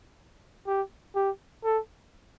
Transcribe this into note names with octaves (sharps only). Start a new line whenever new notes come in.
G4
G4
A4